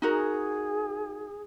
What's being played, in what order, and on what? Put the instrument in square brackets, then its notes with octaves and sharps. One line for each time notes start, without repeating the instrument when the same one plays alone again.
[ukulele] D#4 F#4 A#4 [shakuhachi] G#4